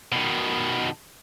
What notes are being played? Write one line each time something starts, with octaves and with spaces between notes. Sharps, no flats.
B2 D#3